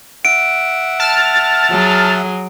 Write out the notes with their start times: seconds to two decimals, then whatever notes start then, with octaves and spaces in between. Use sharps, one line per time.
0.25 E5 F#5 D7
1.00 A5 F6 A6
1.70 F#3 G#4